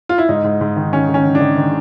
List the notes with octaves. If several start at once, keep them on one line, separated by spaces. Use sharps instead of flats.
F4
E4
G#2 D#4
G#2
G#2
D#3
D#3 C#4
D#3
C#4
D#3
D4
D#3
D#3